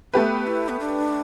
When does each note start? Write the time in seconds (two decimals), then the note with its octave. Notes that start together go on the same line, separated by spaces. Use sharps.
0.14 A3 B3 G4 B4
0.47 E4
0.69 B3
0.80 D4